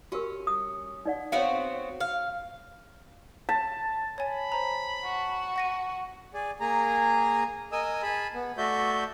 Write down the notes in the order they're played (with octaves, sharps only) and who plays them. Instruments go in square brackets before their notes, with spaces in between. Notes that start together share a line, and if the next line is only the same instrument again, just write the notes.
[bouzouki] C#4 [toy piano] F#4 G4 A#4
[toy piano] D#6
D#4 D5 F#5
[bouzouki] B3 C4 F#4 [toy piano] C#5 F5
[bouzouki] F5
[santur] A5 [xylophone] B6
[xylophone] C#5 G#5 [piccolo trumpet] B5
[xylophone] C5 A#5
[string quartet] F#4
[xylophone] F#5 A#6 D#7
[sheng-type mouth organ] G#4 D5
A#3 G#4 A#5
A#4 D#5 G#5 D#6 E6
G#4 A5 B5
B3
A3 F#4 D5 E5 G6